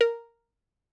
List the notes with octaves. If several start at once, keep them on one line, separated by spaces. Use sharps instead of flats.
A#4